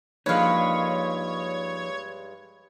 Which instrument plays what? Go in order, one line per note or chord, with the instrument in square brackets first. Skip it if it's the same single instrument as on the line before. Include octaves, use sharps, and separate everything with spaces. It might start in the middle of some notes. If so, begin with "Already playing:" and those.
[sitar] G2 G#3 [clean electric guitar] F3 A#3 D#4 [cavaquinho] B4 F5 [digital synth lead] C#5